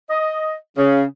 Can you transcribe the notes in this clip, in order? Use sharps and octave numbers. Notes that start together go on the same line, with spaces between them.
D#5
C#3